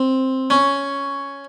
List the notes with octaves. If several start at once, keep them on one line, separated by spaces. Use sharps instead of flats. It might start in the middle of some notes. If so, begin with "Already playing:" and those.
Already playing: C4
C#4